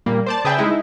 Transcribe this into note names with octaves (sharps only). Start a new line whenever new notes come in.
A#2 G3 A#3
C5 D5 A5
C#3 G#4 B4 E5 G5 A5
G#3 D#4 E4